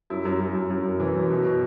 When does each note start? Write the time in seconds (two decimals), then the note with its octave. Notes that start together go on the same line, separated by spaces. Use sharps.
0.10 F#2 E4
0.25 F#2
0.40 F#2
0.54 F#2
0.70 F#2
0.85 F#2
1.00 E3
1.15 F#2
1.30 B2
1.45 B2